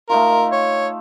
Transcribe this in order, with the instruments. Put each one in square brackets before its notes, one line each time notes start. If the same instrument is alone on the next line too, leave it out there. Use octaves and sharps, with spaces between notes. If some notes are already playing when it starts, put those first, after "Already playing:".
[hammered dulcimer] A3 D#4 F4 [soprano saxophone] A#4
[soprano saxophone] C#5